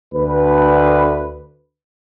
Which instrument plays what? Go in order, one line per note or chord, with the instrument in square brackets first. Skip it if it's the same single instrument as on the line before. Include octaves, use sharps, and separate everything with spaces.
[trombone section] D2 B4